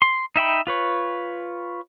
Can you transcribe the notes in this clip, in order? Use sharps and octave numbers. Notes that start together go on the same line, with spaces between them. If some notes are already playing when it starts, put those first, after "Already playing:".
C6
D#4 E5 G5 B5
F4 B4 C#5